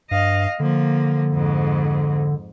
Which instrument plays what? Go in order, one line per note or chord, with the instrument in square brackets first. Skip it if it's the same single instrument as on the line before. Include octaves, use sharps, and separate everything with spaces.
[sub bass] G2 [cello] D#5 F5
[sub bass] D3 [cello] F3 A#3
[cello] F2 G#2